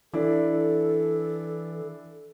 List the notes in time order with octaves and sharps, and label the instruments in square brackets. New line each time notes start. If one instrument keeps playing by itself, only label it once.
[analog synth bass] E3 [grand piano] D4 E4 D5 [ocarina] A4